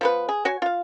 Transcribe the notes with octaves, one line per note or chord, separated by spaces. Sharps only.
F3 B3 B4
G#4
F#4 C#5 G#5
F4 F5